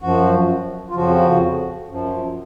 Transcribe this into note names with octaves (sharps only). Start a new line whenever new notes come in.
F#2 F3 F#4
F4
F2 C#3 F3 F#4
F#2 F3